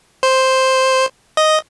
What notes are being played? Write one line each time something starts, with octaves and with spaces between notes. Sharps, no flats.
C5
D#5